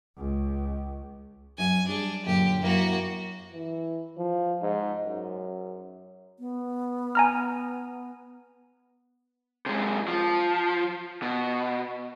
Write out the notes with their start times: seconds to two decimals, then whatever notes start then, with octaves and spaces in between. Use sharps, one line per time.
0.18 C#2
1.58 F#2 F#4 F#5 G#5
1.88 G3 D4 G#4
2.26 F#2 A#2 D3 G4
2.62 F#2 A#3 E4 F#4 A#4
3.53 E3
4.18 F3
4.62 G#2
5.05 F#2
6.39 B3
7.15 G#5 A#5 F6
9.66 C3 G#3
10.08 F3
11.22 B2